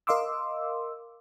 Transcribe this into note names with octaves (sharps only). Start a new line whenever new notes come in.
A#4 D#5 F5 C6 D6 E6